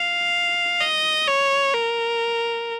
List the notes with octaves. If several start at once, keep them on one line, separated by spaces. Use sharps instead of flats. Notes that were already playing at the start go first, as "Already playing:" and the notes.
Already playing: F5
D#5
C#5
A#4